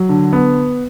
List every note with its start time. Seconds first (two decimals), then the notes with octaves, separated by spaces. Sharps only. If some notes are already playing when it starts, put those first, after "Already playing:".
Already playing: F#3
0.09 D3
0.33 B3